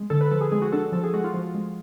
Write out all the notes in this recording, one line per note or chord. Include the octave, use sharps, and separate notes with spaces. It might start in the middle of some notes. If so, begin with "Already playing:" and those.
Already playing: G#3
D3 A4
B4
F3 A4
G#4
G#3 G#4
F#4
D4 A4
F3 A4
G#4
G#3 F#4
F4
F3
G#3